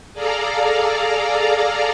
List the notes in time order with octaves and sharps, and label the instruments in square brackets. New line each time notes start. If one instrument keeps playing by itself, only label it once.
[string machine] G#4 A4 D5 F5 A#5